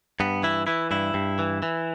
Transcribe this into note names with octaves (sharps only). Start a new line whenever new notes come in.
G2 B3
E3 E4
E3 E4
G2 E4
G2
E3
E3